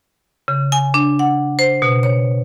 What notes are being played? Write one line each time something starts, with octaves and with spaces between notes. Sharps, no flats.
C#3
G#5
D4
F#5
C5
B2
C#5